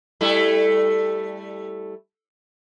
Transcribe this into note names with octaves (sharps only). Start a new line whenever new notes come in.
G3 A3 E4